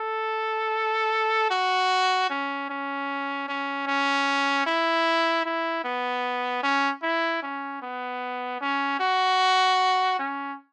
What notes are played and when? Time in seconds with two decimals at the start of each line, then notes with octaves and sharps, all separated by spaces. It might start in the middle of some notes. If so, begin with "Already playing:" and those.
Already playing: A4
1.51 F#4
2.30 C#4
2.69 C#4
3.49 C#4
3.87 C#4
4.66 E4
5.46 E4
5.84 B3
6.63 C#4
7.03 E4
7.43 C#4
7.82 B3
8.61 C#4
9.00 F#4
10.19 C#4